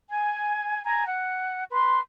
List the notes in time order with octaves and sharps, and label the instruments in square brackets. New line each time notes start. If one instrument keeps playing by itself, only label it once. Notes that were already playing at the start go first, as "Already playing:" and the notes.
[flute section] G#5
G#5 A#5
F#5
B4 C6